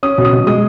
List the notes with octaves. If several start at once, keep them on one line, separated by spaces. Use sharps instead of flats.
C#4 D#6
B2
D#6
B2
G#3 D#6